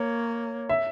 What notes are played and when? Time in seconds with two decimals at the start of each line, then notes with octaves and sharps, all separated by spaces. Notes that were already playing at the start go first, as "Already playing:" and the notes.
Already playing: A#3 C#5
0.69 E5